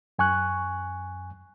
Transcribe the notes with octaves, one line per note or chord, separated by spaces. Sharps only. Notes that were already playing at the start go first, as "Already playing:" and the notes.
F#2 G#5 C#6 F#6